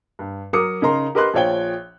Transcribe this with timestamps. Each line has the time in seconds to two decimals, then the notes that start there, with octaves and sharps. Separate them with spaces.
0.19 G2
0.53 F#3 A#4 D6 D#6 C#7
0.82 C#3 D#4 A#4 A#5 C6
1.15 G4 A#4 B4 D#5 C6 F#6
1.34 A#1 F3 F4 C#5 G5 G7